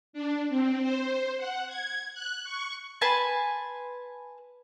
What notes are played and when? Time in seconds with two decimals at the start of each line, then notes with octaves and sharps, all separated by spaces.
0.13 D4
0.49 C4
0.82 C5
1.37 F#5
1.68 G#6
2.14 F#6
2.44 C#6
3.01 B4 G#5 A5 C6